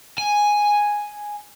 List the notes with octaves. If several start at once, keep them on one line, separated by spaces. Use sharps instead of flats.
G#5